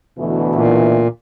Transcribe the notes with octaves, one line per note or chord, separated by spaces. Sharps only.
D2 B2 E3
A#2